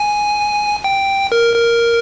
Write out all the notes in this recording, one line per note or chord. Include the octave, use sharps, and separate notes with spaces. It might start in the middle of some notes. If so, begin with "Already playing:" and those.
Already playing: G#5
G5
A#4
A#4